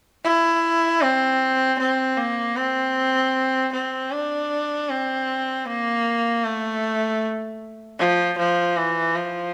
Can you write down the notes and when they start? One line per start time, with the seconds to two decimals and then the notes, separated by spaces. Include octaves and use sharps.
0.24 E4
1.02 C4
1.79 C4
2.17 A#3
2.56 C4
3.73 C4
4.12 D4
4.90 C4
5.66 A#3
6.44 A3
7.99 F3
8.38 F3
8.77 E3
9.16 F3